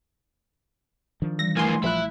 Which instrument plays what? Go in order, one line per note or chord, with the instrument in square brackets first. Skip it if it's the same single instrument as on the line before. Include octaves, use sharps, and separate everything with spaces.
[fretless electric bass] D#3 F3 D4
[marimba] E3 G3 [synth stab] A#6
[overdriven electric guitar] E3 A#3 [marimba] A3 F6 [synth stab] G#5 C6
[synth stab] A#1 F#6 [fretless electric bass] F3 [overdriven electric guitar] E4